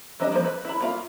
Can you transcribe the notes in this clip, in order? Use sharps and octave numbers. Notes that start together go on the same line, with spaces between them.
E3 G3 D4 D#5
F3 A#3 G#4 C5
B4
E4 B5
A#3 F4 F5